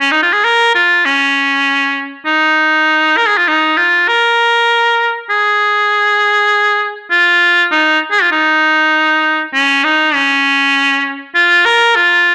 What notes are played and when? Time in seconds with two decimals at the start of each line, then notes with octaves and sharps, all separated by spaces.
0.01 C#4
0.11 D#4
0.22 F4
0.33 G#4
0.45 A#4
0.75 F4
1.05 C#4
2.26 D#4
3.17 A#4
3.27 G#4
3.37 F4
3.48 D#4
3.77 F4
4.08 A#4
5.30 G#4
7.11 F4
7.72 D#4
8.11 G#4
8.22 F4
8.32 D#4
9.54 C#4
9.84 D#4
10.14 C#4
11.35 F4
11.65 A#4
11.96 F4